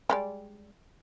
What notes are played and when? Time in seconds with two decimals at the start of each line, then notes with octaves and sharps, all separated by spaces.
0.10 G3 G#3 D5